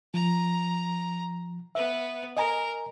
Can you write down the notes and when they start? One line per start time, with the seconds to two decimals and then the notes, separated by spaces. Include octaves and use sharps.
0.14 F3 A#5
1.75 B3 B4 E5
2.37 A#4 D#5 G#5 A#5